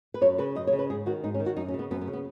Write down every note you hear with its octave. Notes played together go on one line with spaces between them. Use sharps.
B4
F#2 C#5
C#3 B4
F#2 D#5
C#5
C#3
B4
G#2 G#4
D#3 F#4
G#2 D#4
C#4
D#3
F#4
F#2 D#4
C#4
C#3
B3
F#2 B3
B3
C#3
B3